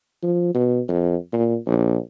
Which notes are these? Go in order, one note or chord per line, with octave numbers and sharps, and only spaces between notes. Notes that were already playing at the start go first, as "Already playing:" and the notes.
F3
B2
F2
A#2
A#1